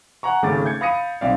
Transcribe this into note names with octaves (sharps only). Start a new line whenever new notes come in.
F#5 G#5 A#5 C#6
G#1 C#3 A3 C#4 D6 A6
G6 G#6 C#7
F5 B5 D#6 A#6 C#7 D#7
B1 C4 D5 E5 F5